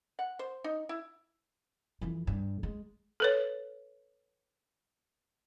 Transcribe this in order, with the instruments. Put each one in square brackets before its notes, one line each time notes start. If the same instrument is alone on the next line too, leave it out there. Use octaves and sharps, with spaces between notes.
[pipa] F#5
C5
D#4
E4
[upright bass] F2 E3
G2
G#3
[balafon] A4 B4 C#5